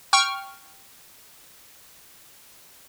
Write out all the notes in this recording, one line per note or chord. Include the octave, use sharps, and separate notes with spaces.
G5 C#6 F6